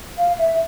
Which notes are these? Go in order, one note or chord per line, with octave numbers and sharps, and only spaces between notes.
F5
E5